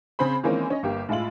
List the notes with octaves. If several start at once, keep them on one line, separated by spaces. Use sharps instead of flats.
C#3 C4 G#4 C5 B5
D#3 E3 G#3 A#3 C4 C#4
C#4 D#5
G1 A#3 G4
A2 G#3 E4 F4 F#7